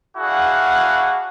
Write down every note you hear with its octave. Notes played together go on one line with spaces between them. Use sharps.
D4 E4 F#4 G#4 F5 F#5